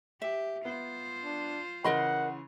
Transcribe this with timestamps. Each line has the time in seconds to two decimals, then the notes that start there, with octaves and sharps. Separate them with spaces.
0.22 G4 E5
0.65 B3 F4 C5
1.24 D4
1.84 C#3 E3 A#4 D#5 F#5 B5 C6